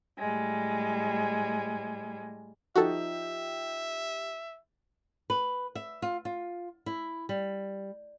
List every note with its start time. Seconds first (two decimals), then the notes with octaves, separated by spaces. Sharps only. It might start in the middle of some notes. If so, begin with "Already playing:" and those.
0.20 A2 G3 G#3
2.76 F3 D#4 F#4 G4 A4 E5
5.30 B4
5.75 E5
6.02 F4
6.25 F4
6.86 E4
7.29 G3